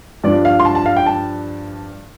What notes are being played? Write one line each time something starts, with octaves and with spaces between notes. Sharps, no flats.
G2 F3 D4 D5
F5
C6
A5
A5
F5
G5
A5